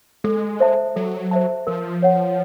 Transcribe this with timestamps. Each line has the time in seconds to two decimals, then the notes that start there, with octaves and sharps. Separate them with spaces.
0.24 G#3 A4
0.60 C5 E5 A5
0.96 F#3 A4
1.31 C5 E5 A5
1.67 F3 A#4
2.02 C#5 F#5